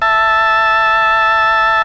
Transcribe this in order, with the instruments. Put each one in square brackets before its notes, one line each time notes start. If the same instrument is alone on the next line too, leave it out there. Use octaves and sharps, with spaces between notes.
[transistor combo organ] E5 A5